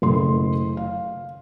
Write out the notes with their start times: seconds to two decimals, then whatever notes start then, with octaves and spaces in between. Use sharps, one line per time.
0.02 F#1 A3 C6
0.77 F5